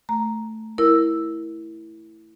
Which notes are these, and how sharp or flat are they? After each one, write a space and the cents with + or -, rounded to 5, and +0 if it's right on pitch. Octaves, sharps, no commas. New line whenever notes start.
A3 +0 A#5 +0
E4 +0 A#4 +0 E6 +0